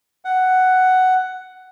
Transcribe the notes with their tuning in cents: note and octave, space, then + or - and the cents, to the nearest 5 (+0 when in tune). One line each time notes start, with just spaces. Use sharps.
F#5 +5